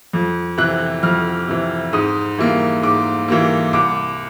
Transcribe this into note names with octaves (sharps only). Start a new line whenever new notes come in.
F2
C3 E3 F#6
F2 F6
C3 E3
G#2 D#6
E3 G3 A#3
G#2 D6
E3 G3 A#3
C2 D6